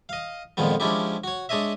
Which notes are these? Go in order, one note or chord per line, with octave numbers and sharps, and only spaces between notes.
D#5 F5
F2 A#2 D#3 F3 G#3 B3
F3 G#3 C#4 D4 E4 G4
F#4 C#5
G#3 D4 C#5 D#5 E5